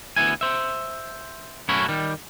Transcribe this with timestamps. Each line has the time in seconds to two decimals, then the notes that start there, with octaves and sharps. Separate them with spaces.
0.16 D2 B3 E4 G#5
0.41 C5 E5
1.69 F#2 A3 C#4 E4 F#4 B5
1.89 D#3 G3